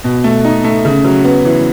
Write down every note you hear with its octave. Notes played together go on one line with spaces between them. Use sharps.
B2
A3
D#4
A3
C#3
F#3
B3
E3